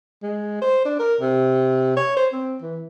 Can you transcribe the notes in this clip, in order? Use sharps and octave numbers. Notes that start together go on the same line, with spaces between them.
G#3
C5
D4
A#4
C3
C#5
C5
C4
E3